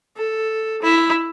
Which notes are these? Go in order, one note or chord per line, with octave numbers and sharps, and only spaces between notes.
A4
E4